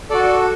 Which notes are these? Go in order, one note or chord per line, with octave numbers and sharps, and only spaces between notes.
F#4 A4 D5